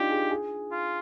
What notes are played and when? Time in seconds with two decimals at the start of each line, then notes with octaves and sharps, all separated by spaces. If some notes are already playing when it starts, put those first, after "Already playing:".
Already playing: D4 D#4 F4 G4
0.10 G#4
0.31 G#4
0.71 F4